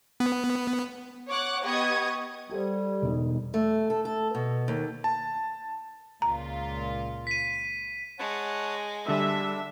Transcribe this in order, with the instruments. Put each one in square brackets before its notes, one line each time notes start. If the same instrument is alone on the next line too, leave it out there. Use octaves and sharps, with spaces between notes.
[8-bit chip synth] B3
[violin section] C#5 F#5 D6 F#6
B3 G4 D#5 C#6 D#6 G#6
[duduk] G3 [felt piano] G4 A4 C5
[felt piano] E1 D#4
[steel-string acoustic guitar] A3
A4
A4
B2
D#2
[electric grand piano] A5
[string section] C#2 A#2 F4 [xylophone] A#5
[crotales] B6 D#7
[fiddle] G#3 [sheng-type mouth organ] C#5 F#5 A5
[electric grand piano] D3 G3 [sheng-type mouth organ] D4 [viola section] E5